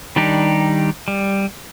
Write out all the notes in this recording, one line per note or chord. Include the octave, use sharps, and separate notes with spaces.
D#3 G3 D4 D#4 G4
G3